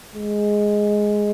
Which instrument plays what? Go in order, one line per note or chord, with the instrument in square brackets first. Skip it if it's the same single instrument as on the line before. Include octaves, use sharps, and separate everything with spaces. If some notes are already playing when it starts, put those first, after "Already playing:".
[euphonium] G#3